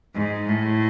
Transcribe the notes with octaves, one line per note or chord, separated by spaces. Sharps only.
G#2
A2